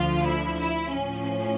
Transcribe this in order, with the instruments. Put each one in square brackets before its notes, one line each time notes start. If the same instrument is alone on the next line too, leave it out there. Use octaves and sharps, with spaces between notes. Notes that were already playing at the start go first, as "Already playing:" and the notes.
Already playing: [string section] D2 D3 F3 F4
E4
E4
A2 F3 C#4